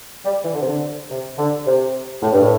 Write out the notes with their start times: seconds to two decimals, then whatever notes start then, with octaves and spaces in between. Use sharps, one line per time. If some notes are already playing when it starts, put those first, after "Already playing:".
0.24 G3
0.44 E3
0.53 D3
0.61 C3
0.68 D3
1.10 C3
1.38 D3
1.66 C3
2.23 A2
2.33 G2
2.42 A2